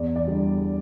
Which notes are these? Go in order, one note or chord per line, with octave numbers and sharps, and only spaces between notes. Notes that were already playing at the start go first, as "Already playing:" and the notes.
Already playing: E2 D5
D5
D3 G3